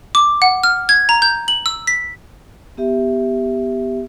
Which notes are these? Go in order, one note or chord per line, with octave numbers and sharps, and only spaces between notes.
D6
F#5
F6
G#6
A#5
G6
F#7
E6
B6
B3 G4 E5